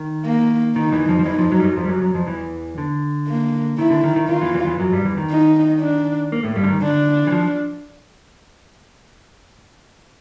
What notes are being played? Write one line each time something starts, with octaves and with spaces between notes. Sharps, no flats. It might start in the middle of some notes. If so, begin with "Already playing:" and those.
Already playing: D#3
A#3
D#3 D#4
E2 E3
F2 F3
F3
E2 E3 D#4
F2 F3
F#2 F#3
G3
F#2 F#3
F2 F3
G3
F#2 F#3
F#2 F#3
F2 F3
E2 E3
D3
A#3
D#3 E4
D3
D#3
D#3
D#3 F4
E2 E3
E2 E3
E2 E3
F#2 F#3
G2 G3
E2 E3
D#3
D#4
D4
A#3
A2 A3
G2 G3
D3
D#3
D3 D4
E3
F3